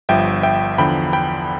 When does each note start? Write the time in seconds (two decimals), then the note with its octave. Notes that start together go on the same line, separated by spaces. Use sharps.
0.09 G1 G2 F3 E5 G5
0.43 E5 G5
0.78 E2 D3 F3 G5 B5
1.13 G5 B5